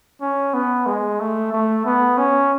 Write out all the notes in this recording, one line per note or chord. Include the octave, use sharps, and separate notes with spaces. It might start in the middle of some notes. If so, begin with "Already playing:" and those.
C#4
B3
G#3
A3
A3
B3
C#4